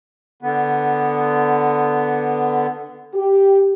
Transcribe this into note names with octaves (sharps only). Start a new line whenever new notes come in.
D3 B3
G4